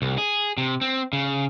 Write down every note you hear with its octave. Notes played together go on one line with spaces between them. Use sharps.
C2
G#4
C3
C4
C#3